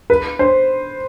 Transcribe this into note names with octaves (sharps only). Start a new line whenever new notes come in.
B4
C5